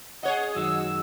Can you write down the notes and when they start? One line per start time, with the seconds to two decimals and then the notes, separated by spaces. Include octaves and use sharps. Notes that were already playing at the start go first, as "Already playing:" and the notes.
0.23 G#4 C#5 D#5 F#5
0.55 F#2 D#3 G#3 F#4 E6